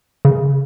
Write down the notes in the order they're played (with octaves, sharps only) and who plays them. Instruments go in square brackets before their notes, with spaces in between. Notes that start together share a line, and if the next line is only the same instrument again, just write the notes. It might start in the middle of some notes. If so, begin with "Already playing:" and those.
[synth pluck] C#3